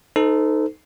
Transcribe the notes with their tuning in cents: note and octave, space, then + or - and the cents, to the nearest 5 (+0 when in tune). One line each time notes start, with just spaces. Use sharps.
D#4 +0 A4 +0 C5 -40